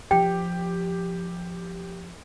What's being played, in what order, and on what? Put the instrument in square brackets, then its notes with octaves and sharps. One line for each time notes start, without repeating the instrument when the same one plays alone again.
[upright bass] F3 [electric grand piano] G4 [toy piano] G5